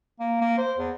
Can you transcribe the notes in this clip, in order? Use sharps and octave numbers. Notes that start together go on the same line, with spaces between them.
A#3
A#3
C5
E2